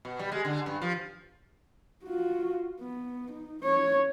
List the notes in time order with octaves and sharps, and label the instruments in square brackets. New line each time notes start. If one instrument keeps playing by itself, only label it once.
[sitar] B2
G3
G#3
D3
G2
F3
[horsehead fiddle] F4 F#4
B3
D#4
C#4 C#5